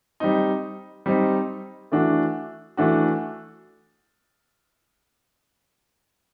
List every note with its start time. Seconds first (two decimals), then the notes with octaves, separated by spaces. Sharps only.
0.20 G3 C4 D#4
1.06 G3 C4 D#4
1.92 E3 A3 D4 F#4
2.77 E3 A3 D4 F#4